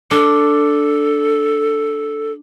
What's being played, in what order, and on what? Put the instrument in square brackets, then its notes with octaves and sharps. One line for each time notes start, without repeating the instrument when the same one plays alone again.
[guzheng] D4 [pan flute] A4